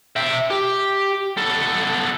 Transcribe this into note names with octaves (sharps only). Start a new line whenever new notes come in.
E5 G5
G4
B3 A4